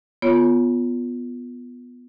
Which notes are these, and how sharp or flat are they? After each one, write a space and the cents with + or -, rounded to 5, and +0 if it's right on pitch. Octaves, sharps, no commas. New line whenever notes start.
B3 +0 F4 +0 C#5 +0